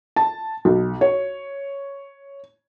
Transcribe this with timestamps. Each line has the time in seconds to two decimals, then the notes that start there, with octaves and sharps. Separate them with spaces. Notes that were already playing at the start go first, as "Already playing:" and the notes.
0.16 A5
0.65 B1
1.01 C#5